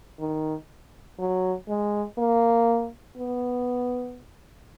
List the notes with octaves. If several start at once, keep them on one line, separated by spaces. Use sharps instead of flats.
D#3
F#3
G#3
A#3
B3